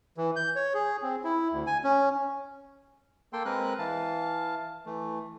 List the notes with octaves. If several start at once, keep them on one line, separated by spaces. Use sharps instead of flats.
E3
G6
C#5
G#4
C4
E4
D2
G#5
C#4
A#3 A4 G5 C6
G#3 C4 A#4 B4 F#6
E3 F5 A5
E3 A3